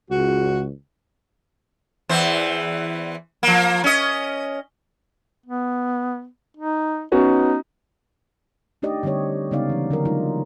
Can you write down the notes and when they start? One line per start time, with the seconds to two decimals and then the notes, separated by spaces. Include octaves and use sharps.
0.10 C#2 F#4
2.09 E2 E3 C5
3.43 F3 A#3
3.84 C#4 D#5
5.46 B3
6.57 D#4
7.12 B3 C#4 D#4 F#4
8.82 A3 D4 D#4 G4 D5 D#5
9.03 D3 G3 C4 G4 C#5
9.51 C#3 G#3 B3 D#4 D5 F5
9.70 E3 F#3
9.91 D3 F#3 A#4
10.05 F#3 G#3 A3 D#4 F4